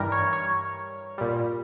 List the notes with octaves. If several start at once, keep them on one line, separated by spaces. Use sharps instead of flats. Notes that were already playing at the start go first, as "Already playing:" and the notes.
Already playing: G2 E3 G3 A#4
C#5
C#5
A#2 G3